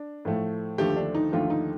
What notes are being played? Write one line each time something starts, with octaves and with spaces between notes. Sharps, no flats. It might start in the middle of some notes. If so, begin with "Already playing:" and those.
Already playing: D4
A2 F3 A3
D#2 D3 F3 A3 G4
D4
D#4
D#2 D3 F3 A3 F4
D#4